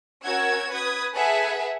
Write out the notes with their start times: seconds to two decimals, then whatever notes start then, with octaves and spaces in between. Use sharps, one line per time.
0.24 C#4 F#4 A#4 F#5 E6 G#6
0.72 B4 D#6 G#6
1.15 G#4 A4 B4 E5 F#5 G#5